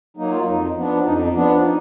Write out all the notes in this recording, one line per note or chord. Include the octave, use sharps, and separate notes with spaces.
F#3 A#3 D#4
F4
F2 D#4
F3 B3 D4
F2 D#4
F3 B3 D4
D#4